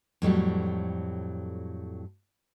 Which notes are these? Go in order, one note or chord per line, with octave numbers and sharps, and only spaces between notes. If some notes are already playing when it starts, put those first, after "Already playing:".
F2 A2 F#3 G3